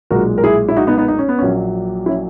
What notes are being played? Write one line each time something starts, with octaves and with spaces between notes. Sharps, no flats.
B1 A#2 G#3 F#4 A#4
A#4
E4 G#4
E4
D#4 F#4
B3 D#4
B3 D#4
D#4
C#4
B3
A#1 A#2 F#3 C#4
C#4 E4